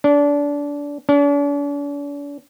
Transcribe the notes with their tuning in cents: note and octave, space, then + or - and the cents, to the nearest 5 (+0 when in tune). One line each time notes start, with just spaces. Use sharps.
D4 -25
D4 -45